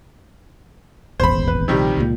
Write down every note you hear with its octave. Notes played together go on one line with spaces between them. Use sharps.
D#1 G#1 E2 C5 B5
B4
A#1 C3 D#3 G3
C#2 A#2